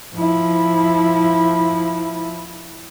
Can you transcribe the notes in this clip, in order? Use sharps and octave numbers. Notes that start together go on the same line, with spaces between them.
F3 E4